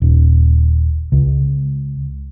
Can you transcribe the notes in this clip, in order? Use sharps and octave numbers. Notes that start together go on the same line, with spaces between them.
D#1
C#2